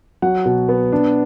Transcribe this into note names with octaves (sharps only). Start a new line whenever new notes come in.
F#3 F#5
B2
B3
D4